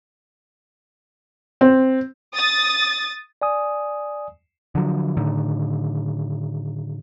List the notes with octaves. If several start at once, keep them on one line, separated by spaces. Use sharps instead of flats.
C4
D#6 A6
D5 G#5 D#6
D3 F3 F#3
A2 D3 D#3